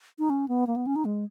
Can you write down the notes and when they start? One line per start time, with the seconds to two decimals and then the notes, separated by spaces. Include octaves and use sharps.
0.19 D#4
0.30 C#4
0.48 B3
0.67 A#3
0.76 B3
0.86 C#4
0.96 D#4
1.05 G#3